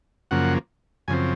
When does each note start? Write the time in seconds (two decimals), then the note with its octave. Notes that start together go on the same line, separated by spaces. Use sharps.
0.31 F#2 C#3 F3 A#3 F#5
1.08 F#2 C#3 F3 C4 G#5